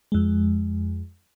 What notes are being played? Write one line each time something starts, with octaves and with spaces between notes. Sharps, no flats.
F2 G#3